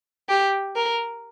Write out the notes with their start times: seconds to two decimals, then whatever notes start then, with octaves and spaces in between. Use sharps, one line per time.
0.29 G4
0.75 A#4